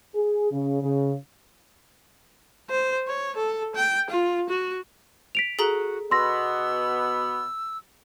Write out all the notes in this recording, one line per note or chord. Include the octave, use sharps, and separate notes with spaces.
G#4
C#3
C#3
C5
C#5
A4
G5
F4
F#4
B6 D7 F7
F#4 G#4 A4 A#5
B2 B3 C6 E6 A#6